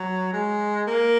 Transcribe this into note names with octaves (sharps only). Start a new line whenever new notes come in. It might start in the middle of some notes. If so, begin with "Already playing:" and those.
Already playing: F#3
G#3
A#3